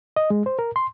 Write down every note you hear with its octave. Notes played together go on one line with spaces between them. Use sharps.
D#5
G#3
C5
A#4
C6